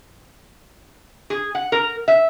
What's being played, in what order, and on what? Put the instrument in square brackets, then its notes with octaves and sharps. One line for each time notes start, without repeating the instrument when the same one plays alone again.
[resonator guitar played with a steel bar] G#4
F#5
A#4
E5